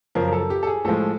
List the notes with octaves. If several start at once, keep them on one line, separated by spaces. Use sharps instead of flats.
F#2 C#3 F3 A#4
A#4
A4
G4
A4
G#4
A2 F3 G#3 A4